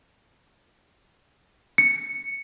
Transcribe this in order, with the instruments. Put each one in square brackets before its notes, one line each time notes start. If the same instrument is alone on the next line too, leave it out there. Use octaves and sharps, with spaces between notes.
[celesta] C#7